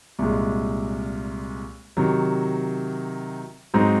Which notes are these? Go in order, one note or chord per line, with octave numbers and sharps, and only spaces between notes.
C2 A#2 G#3
C3 D#3 F#3
G#2 F#3 C4 D#4